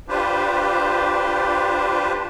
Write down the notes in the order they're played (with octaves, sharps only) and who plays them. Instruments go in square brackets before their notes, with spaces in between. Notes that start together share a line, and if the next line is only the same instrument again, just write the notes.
[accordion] D4 F4 G4 B4 C5